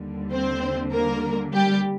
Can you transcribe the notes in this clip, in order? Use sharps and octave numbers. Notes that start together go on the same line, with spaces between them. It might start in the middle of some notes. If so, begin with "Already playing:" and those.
Already playing: D#2 D3 G3
C4 C5
A#3 A#4
G3 G4